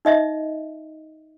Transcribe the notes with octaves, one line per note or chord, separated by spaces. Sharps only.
D#4 D#5 E5